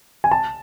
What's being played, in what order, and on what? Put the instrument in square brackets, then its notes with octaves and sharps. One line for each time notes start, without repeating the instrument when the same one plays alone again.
[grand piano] G#5
A5